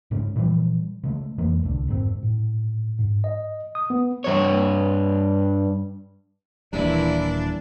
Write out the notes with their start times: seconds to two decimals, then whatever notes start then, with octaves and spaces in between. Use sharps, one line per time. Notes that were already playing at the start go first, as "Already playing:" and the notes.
0.11 G#2 C#3 G#3 C#4
0.36 A#2 E3 F3 G3
1.04 C#3 G#3 A3
1.38 F2 E3 G#3 A#3
1.63 D1 C2 D3
1.88 F1 G#2 D3 C4
2.23 A2
2.99 G#2
3.24 D#5
3.75 D#6
3.90 B3
4.24 G2 C#5
6.73 D#1 A#2 E3 G3 D4 E4